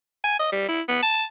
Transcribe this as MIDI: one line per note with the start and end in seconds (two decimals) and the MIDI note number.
0.24 0.39 80
0.39 0.49 75
0.52 0.68 55
0.68 0.81 64
0.88 1.00 59
1.03 1.23 81